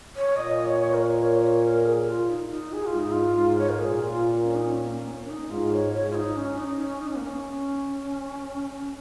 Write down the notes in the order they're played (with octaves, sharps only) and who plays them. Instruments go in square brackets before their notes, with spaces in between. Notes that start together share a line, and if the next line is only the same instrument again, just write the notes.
[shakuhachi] C#5
[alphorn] A#2 [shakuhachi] D#5
[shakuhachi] C#5
A#4
C#5
C#5
A#4
G#4
G#4
F4
D#4
D#4
G#4
F4
[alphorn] G#2
[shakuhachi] D#4
F4
[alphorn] G#2
[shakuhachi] C#5
A#4
[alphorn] A#2 [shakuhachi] G#4
[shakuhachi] F4
C#4
D#4
C#4
A#3
A#3
C#4
C#4
D#4
[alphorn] G#2 [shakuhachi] F4
[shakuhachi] C#5
[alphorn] G#2 [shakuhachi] C#5
[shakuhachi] F4
D#4
C#4
D#4
C#4
D#4
C#4
A#3
C#4